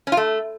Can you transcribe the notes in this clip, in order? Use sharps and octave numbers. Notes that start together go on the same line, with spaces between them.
C#4
F4
A3